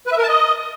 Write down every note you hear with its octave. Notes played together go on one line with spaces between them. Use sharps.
B4
E5
A#4
A5
D#5